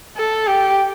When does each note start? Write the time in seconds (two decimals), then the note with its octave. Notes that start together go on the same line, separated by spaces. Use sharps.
0.17 A4
0.47 G4